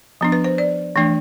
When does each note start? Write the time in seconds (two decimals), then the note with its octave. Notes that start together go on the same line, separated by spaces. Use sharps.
0.21 F3 B3 D4
0.32 B4
0.44 C5
0.58 D5
0.96 E3 A3 D4